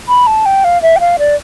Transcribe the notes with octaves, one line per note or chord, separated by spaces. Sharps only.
B5
A5
G5
F5
E5
G5
F5
D5